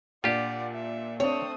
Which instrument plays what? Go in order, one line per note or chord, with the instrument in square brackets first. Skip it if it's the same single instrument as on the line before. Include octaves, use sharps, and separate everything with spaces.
[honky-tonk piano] A#2 D4 [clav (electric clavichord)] F4 G4 [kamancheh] D5 F#5
[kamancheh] E5
[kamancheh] A3 D#6 [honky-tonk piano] C4 D4 [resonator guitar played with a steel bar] C#5